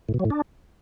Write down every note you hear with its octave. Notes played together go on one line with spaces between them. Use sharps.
A2
B2
F#3
A2
D4